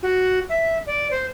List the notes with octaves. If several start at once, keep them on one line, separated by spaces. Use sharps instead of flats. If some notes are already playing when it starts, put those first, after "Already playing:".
F#4
E5
D5
C5